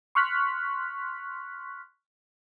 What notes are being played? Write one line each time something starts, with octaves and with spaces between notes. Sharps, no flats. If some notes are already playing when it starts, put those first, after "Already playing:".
C6 C#6 F6 F#6 B6